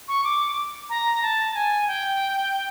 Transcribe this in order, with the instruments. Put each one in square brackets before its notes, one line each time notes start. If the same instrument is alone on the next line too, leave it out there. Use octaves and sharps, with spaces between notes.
[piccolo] C#6
D6
A#5
A5
G#5
G5